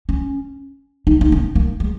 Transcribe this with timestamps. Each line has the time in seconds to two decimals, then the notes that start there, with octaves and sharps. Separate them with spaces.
0.09 C#4
1.07 D#4
1.21 A#3
1.32 C#4
1.55 A#3
1.80 G#3